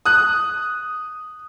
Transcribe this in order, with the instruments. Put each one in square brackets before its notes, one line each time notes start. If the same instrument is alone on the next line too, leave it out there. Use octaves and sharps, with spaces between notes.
[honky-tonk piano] D#6 F#6